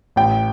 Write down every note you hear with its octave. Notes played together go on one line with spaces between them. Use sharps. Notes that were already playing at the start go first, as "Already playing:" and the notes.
A1 G5